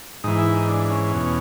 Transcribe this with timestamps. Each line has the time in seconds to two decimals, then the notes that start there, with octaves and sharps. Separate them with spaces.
0.24 G#2 E3 D#4
0.38 E4
0.53 D#4
0.68 D4
0.85 D4
0.90 C#4
1.12 E2 B2